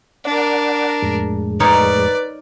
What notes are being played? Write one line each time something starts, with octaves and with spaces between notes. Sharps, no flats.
D4 A#4 D5 F#5
F2 A2 G#3
D#4 A#4 B4 C#5 D5